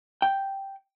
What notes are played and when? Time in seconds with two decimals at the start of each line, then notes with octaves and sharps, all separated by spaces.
0.22 G5